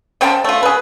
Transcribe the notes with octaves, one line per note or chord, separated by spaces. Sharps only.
C#3 C5 G5 A5
A3 F4
G#4 B4